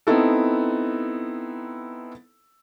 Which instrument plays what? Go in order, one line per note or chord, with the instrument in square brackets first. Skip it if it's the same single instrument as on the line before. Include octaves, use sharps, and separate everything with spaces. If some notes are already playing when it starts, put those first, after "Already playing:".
[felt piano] B3 C4 D#4 E4 A4